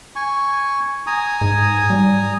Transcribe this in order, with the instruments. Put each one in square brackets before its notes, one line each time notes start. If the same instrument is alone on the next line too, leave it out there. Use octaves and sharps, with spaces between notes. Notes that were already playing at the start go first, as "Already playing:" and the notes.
[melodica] G#5 C#6
G#5 A#5 D#6
[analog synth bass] G#2
G3